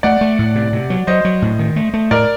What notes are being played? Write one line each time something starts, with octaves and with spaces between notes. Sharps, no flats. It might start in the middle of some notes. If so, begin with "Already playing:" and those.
A3 D5 F#5
A3
A2
C3
C3
F#3
F#3 C5 D#5
F#3
A2
D#3
A3
A3
A2 A#4 D5